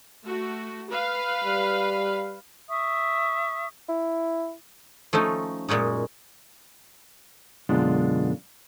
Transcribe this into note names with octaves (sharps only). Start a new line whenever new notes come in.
A3 F#4
B4 F5
G3
E5 C#6 D#6
E4
F3 A3 C#4 D#4
F#2 A#2 G#3 C#4 D#4
F#2 B2 D3 G#3 D4 F4